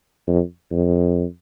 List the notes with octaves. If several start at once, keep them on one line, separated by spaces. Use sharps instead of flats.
F2
F2